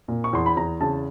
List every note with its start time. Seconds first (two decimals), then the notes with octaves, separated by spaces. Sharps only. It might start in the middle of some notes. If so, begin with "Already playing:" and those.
0.08 A#2
0.24 C#6
0.33 E2 C6
0.46 B5
0.57 E2 A#5
0.81 C#3 A5